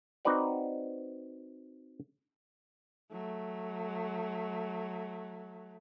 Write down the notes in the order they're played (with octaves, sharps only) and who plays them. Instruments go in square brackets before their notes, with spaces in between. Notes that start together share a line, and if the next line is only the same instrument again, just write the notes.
[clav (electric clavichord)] C4 D#4 F#4 B4 D5 F#5
[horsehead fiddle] F#3 A3